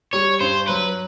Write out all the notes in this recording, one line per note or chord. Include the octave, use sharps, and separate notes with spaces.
G3 C#5
G2 C5
F#3 B4